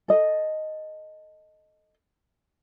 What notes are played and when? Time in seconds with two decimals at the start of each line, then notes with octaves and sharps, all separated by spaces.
0.08 A4 D#5